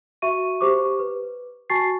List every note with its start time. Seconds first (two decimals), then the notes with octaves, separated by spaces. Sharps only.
0.22 F#4 E5 C#6 D#7
0.61 G4 C5 C#6 D6
0.99 B4
1.70 F#4 G#5 A5 C#6 A6 C7